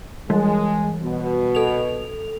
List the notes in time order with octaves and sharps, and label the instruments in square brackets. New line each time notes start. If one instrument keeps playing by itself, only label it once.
[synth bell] E3 G3 [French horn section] G#3
[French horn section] B2
[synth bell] A4 F7